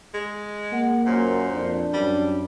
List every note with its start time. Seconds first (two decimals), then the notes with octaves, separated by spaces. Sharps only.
0.14 G#3
0.72 A#3 F#5
1.06 F#2 A#2 C5
1.54 F2 D4
1.93 F#2 G3